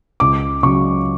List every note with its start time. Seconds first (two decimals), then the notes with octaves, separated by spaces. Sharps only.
0.20 C#2 D6
0.63 C#3 F#3 C#6